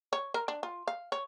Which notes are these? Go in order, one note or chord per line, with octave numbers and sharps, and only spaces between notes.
C#5
A#4
D4
F4
F5
C#5